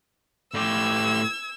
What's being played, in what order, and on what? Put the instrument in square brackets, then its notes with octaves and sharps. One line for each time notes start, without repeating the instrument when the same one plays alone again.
[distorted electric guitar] A2 G4 [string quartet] E6 G#6